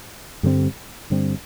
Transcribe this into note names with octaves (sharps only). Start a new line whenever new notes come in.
G2 D3 G3 C4
G2 D3 G3 C4